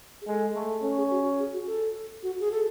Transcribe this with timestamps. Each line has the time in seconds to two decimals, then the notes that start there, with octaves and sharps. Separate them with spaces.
0.22 G#4
0.27 G#3 A4
0.55 A3
0.82 C#4 A4
0.97 G#4
1.10 F#4
1.39 G#4
1.53 F#4
1.67 A4
2.23 F#4
2.40 G#4
2.51 A4